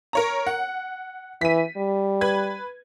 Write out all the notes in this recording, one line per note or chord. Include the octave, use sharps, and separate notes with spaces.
A#4 C#5 A#5
F#5
E3 B6 D#7
G3
B4 B5 G#6